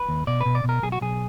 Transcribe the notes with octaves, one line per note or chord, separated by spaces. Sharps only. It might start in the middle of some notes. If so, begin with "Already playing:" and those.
Already playing: B4
D#2
B2 D5
B2 B4
D5
B2
A#4
B1 G#4
F#4
B1 G#4